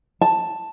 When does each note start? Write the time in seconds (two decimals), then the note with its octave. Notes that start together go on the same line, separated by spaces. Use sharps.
0.21 A5